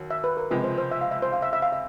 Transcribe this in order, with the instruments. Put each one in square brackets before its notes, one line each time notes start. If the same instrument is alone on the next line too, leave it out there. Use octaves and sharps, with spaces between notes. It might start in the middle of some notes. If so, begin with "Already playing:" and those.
Already playing: [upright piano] D#2 F#3
[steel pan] E5
B4
A#4
[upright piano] C#2 C3 F3 G#3 [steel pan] B4
[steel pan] C5
C5
E5
F5
E5
C5
F5
E5
E5
F5
E5